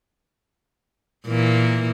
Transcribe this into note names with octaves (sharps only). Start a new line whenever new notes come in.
A#2 E3 A#3